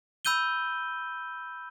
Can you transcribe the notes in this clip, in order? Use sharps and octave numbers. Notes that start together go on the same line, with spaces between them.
B5 E6 G6 D#7 G7